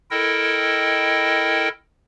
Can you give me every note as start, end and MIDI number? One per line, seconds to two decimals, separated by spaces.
0.11 1.69 64
0.11 1.69 69
0.11 1.69 70
0.11 1.69 75
0.11 1.69 79